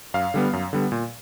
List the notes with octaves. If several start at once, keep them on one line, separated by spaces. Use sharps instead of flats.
F#2 F5
D3 G3 B3
F#2
D3 G3 B3
A#2